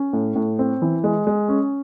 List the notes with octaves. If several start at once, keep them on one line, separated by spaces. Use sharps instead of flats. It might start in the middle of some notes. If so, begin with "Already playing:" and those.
Already playing: C#4
A2
A2
C4
E3
G#3
G#3
C#4